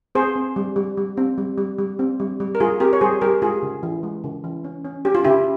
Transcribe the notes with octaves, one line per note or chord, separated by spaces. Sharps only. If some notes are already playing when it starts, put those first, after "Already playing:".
C4 G#4 C5
C4
G3
G3
G3
C4
G3
G3
G3
C4
G3
G3
A#4
G3 F4 G#4
C4 G4 A#4
C#5
G3 G#4 C5
G3 G4 A#4
G#3 F4 G#4
C#3
E3
G#3
C#3
E3
C#4
C#4
C#4 G4
F4
C#3 E4 G4